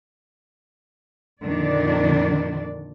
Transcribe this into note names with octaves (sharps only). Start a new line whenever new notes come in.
F2 A#2 D3 D#3 D4 D5